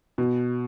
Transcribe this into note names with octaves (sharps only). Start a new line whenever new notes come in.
B2